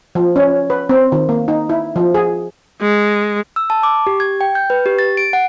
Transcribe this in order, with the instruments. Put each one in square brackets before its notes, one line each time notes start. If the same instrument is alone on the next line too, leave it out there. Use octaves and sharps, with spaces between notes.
[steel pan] F3
C#4
B4
C4
D#3
A#3
D#4
E4
F3
G#4
[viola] G#3
[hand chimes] E6
A5
D6
G4
G#6
G5
G6
B4
G4
A6
D7
F#5